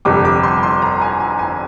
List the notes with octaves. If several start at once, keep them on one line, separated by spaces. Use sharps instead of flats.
G1 F2 C3 G3 D6
D6
C6
C6
A#5
G#5
G#5
G#5